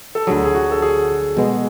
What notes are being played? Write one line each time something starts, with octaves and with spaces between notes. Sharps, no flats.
A4
D2 D3 F#3 G#4
G#4
F#4
A4
G#4
B2 G#3 B3